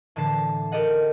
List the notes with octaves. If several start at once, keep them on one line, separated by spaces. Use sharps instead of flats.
A2 D3 E3 A5 C7
G4 A4 A#4 D#5 F#5